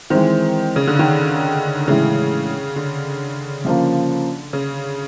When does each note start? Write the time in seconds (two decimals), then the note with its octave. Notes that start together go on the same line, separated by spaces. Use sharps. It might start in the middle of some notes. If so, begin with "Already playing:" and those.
0.10 D#3 E3 G#3 C4
0.76 C#3
0.87 D3
0.99 D#3
1.87 A2 C#3 E3 G#3
2.76 D3
3.65 C#3 F3 A#3
4.53 C#3